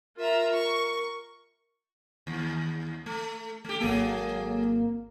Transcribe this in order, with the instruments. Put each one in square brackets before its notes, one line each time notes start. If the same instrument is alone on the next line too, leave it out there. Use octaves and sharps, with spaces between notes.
[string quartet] F4 E5 A#5 [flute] A#4
[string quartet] C#6
[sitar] D#2
A3
A3 G4
[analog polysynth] G#1 A#3 [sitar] F#3 G#4 A4